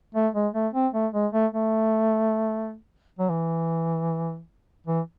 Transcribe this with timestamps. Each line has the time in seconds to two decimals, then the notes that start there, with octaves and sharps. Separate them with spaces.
0.15 A3
0.34 G#3
0.54 A3
0.73 C4
0.94 A3
1.13 G#3
1.33 A3
1.52 A3
3.19 F#3
3.30 E3
4.87 E3